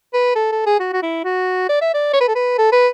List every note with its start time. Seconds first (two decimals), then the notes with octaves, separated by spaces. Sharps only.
0.14 B4
0.36 A4
0.52 A4
0.66 G#4
0.80 F#4
0.93 F#4
1.03 E4
1.24 F#4
1.69 D5
1.82 E5
1.94 D5
2.13 C#5
2.21 B4
2.28 A4
2.35 B4
2.58 A4
2.72 B4